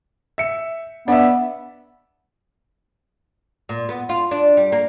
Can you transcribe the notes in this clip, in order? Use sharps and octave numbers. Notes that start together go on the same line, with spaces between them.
E5 C#7
B3 D4 E5
A#2
B3
F4
D4
G3
A#3